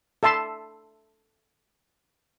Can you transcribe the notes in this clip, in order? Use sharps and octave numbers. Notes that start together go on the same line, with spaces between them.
A4 E5 A5 C6